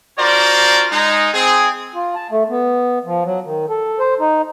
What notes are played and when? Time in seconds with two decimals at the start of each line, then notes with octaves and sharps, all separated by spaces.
0.18 D4 F4 F#4 A#4 C5 D5
0.92 G#3 D#4
1.33 C4 G#4
1.94 F4
2.15 A5
2.31 A3
2.49 B3
3.05 F3
3.24 F#3
3.45 D#3
3.69 A4
3.99 C5
4.20 D#4